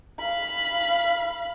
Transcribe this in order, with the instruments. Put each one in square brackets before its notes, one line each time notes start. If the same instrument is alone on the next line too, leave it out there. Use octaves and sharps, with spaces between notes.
[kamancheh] F5 B5